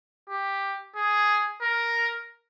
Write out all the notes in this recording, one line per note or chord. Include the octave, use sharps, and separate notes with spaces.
G4
G#4
A#4